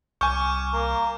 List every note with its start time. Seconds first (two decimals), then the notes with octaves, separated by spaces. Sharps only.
0.21 C2 G#5 C#6 D6 F6 G6
0.73 A#3 A#4